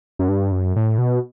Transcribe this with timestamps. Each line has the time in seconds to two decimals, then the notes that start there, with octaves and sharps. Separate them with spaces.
0.19 F#2
0.29 G2
0.52 F#2
0.76 A2
0.98 B2